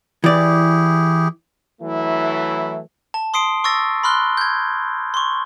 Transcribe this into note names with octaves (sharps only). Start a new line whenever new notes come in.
E3 E4 G4 G#4 D5
E3 F#3 A3 E4
A5
C6 D#6 C7 D7
C#6 E6 A6 A#6
B5 C6 F6 F#6 G7
G6 G#6
C6 C#6